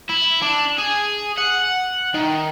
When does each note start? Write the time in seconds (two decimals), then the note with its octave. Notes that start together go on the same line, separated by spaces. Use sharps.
0.09 E4
0.42 D4
0.78 G#4
1.38 F#5
2.14 D#3